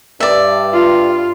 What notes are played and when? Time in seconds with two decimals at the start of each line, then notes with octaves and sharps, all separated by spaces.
0.20 G2 D5 E5
0.73 F4